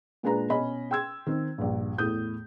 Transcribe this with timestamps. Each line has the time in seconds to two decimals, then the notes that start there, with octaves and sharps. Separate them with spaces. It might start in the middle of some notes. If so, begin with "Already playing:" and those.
0.23 A#2 G#3 D4 G#4 B4 A#5
0.50 B2 C#4 D#5 B5
0.91 G5 C6 E6 G#6
1.26 D#3 C4
1.58 A#1 G2
1.98 E2 A2 D#6 G6